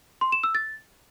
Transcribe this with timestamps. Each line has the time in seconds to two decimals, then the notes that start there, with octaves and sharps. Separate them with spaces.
0.21 C6
0.32 E7
0.44 E6
0.55 A6